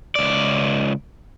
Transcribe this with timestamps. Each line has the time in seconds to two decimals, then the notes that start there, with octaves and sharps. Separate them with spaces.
0.15 C#2 D5